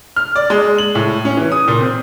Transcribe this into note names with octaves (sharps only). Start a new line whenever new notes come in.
F6
D5
G#3
F#7
A2
C#4
E3
D#6
A#2
C4